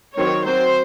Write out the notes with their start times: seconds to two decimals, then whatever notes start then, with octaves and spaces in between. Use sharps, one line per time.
0.17 D#3 F#3 C4 C#5
0.46 F#3 C4 C5